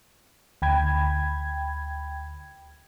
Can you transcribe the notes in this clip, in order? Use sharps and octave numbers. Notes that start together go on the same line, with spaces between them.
D2 G5 B5 G#6